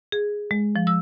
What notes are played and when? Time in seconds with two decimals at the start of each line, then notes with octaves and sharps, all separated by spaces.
0.12 G#4
0.51 G#3
0.76 F3
0.87 E6